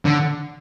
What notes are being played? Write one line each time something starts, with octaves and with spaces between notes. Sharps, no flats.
D3